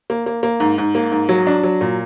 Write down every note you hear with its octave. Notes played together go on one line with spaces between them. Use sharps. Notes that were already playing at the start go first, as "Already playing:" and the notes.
A#3
A#3
A#3
G#2
G#2
A#3
G#2
F#3
D4
F#3
A#2